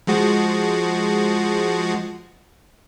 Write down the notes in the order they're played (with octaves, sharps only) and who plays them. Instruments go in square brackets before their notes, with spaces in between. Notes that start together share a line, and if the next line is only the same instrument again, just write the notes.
[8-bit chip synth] F3 G#3 F#4